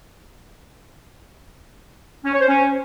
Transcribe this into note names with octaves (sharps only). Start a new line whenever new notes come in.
C#4
C#5
C5
C#4